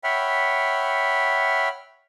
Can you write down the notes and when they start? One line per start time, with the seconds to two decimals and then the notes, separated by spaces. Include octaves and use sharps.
0.04 C#5 E5 F#5 G5 B5 F6